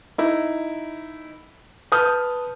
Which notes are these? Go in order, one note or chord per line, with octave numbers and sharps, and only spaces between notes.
D#4 E4
B4 A5 D#6 F6 G6